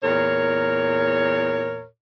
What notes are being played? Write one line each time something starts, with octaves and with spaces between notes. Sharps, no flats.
E2 A#2 A#4 C#5